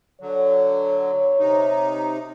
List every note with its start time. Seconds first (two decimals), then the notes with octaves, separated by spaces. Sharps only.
0.21 D3 F#3 C#5
1.40 C3 D#4